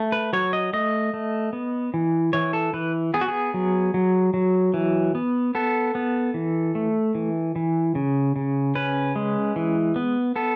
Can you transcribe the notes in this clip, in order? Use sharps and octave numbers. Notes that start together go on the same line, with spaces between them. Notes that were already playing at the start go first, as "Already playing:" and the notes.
Already playing: A3
B4
F#3 C#5
D#5
A3 D#5
A3
B3
E3
E3 C#5
A4
E3 B4
B3 G#4
F#4
G#4
F#3
F#3
F#3
E3
B3
B3 A4
B3
E3
A3
E3
E3
C#3
C#3
C#4 B4
G#3
E3
B3
B3 A4